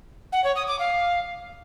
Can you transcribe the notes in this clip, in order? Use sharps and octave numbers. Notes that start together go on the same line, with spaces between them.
F#5
C#5
D#6
D6
F5